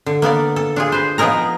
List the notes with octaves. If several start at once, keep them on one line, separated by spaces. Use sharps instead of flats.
D3
A#3 B3 A4 D5
A4
D4 F4 G#4
B4 C5
F3 B3 D#4 G#4 A#4 A#5